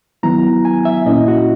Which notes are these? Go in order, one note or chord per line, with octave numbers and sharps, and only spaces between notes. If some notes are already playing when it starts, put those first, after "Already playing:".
D#3 F#3 B3 E4 A#5
G#5
E5
A#2 A#3 C#4 E4 D#5
F#4